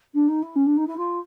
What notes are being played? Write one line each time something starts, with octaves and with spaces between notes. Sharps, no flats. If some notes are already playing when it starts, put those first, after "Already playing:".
D4
D#4
E4
C#4
D4
D#4
E4
F4